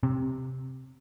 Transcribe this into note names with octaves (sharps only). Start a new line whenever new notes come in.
C3